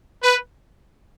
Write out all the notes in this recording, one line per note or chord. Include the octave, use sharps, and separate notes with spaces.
B4